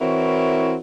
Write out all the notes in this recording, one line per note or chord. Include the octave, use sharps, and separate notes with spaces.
E3 C4 E4 F#4 A#4 C#5